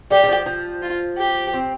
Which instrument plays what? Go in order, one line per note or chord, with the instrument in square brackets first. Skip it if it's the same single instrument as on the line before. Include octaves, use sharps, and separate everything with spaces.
[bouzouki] G3 [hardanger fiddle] G4
[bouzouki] G3
F3
F3
[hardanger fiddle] F4
G4
[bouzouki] C4